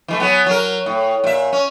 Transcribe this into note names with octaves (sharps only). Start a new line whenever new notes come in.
E3 G#3 A3
F#3 B3
F#3 A#4
A2
A#2 E5
C#4